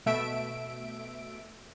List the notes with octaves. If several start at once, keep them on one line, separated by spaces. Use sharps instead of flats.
B2 A3 E5 D7